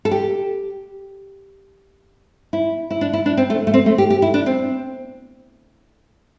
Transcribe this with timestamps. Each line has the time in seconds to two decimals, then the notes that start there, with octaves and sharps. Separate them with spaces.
0.05 A4
0.11 G4
2.53 E4
2.91 E4
3.01 D4
3.13 E4
3.26 D4
3.37 C4
3.50 A3
3.67 A3
3.74 C4
3.86 A3
3.98 G4
4.10 G4
4.22 E4
4.34 D4
4.46 C4